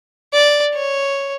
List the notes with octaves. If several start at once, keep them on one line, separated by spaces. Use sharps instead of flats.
D5
C#5